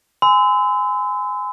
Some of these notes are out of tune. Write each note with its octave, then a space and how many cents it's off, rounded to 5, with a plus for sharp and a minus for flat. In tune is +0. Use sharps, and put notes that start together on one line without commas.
G#5 +0 C6 -45 E6 -20